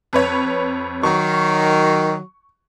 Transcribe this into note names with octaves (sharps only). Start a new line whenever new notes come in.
F2 B4 C#5
D#3 F#3 C#6